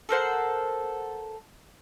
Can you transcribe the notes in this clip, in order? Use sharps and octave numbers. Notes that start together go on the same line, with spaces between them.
A4 A#4 C5 F#5